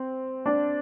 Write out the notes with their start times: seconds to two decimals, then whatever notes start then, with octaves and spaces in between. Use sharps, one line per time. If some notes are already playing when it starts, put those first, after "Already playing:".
Already playing: C4
0.46 D4